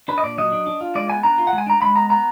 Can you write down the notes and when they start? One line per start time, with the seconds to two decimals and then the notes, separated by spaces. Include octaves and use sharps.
0.08 D4 B4
0.18 D#5
0.23 A#2 D5
0.38 F#3 D#5
0.52 D4
0.67 D4
0.81 F4
0.95 G#3 D5
1.10 B3 G#5
1.23 D4 A#5
1.38 F4
1.47 F#5
1.53 G#3
1.58 G#5
1.66 D4 A#5
1.82 G#3 B5
1.95 B3 A#5
2.10 B3 A#5